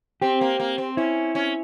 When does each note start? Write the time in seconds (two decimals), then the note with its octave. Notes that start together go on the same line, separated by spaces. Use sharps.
0.22 C4 G4
0.41 A#3
0.60 A#3
0.78 C4
0.97 C#4 E4
1.35 C#4